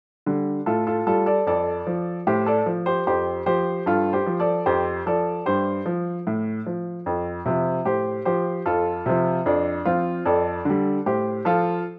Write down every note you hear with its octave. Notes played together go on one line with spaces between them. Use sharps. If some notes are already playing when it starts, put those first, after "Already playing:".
D3 G3
A2 F4 A4
F4 A4
G3 F4 A4
A4 D5
F2 A4 D5
F3
A2 G4 C5
A4 D5
F3
G4 C5
F2 G4 C5
F3 G4 C5
G2 F4 A4
G4 C5
F3
A4 D5
F2 G4 C5
F3 A4 D5
G2 G4 C5
F3
A2
F3
F2
C3 F3
A2 G4 C5
F3 G4 C5
F2 F4 A4
C3 F3
F2 D4
F3 C4 F4
F2 A4 D5
D3 G3
A2 G4 C5
F3 F4 A4